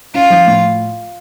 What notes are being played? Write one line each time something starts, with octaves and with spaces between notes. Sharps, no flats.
C#4 F4
F3
A2